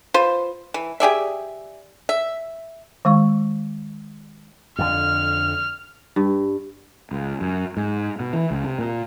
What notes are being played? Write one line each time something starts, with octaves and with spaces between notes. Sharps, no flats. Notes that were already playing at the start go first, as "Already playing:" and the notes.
F4 B4 C5
E3
G4 G#4 D5 E5
E5
D#3 G#3 C#6
F2 D3 F6
G2
C#2
F#2
G#2
B2
E3
C#2
C3
A#2